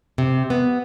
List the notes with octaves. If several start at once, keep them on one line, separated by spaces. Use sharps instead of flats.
C3
B3